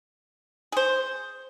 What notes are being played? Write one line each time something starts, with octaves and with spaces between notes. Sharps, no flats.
G#4 C5